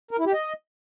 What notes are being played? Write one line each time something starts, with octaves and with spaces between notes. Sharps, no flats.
A#4
E4
G4
D#5